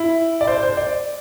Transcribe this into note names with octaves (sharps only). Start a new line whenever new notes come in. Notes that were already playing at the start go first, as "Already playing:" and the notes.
Already playing: E4
D5
C5
C5
D5